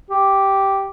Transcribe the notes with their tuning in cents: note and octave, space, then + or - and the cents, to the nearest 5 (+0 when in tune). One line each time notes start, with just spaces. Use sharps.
G4 -5